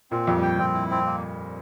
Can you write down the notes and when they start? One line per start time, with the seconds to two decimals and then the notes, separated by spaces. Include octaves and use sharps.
0.11 A#2 C4
0.27 F2 G4
0.35 G2
0.42 G5
0.59 F2 C4
0.74 E4
0.91 C4
1.06 A#3